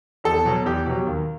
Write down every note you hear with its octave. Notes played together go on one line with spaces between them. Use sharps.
E2 A4
B2 F#3
E2 G4
B2 F#3
D#2